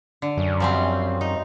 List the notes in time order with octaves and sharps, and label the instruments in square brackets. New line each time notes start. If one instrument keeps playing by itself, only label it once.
[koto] D3
[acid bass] F#2
[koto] F3 G3 C4
D#4